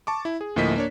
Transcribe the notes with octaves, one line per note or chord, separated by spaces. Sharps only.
A5 C#6 D6
E4
G#4
D2 A2 F3 A#3 D#5 B6
A#3 D4 C#5